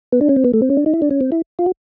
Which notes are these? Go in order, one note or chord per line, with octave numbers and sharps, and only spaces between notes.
B3
D4
C#4
C4
B3
A3
C4
C#4
D4
D#4
E4
D4
C#4
C4
E4
F4
F#4